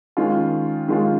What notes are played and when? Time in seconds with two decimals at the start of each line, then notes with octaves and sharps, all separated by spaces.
0.17 D#3 G#3 C#4 F4
0.88 D#3 G#3 C#4 F4